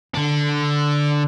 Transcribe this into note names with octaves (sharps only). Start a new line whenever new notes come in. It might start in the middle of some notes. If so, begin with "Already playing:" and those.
D3 D4